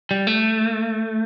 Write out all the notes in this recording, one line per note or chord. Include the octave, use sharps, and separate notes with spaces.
G3
A3